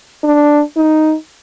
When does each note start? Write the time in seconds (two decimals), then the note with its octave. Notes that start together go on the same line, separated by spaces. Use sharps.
0.24 D4
0.77 D#4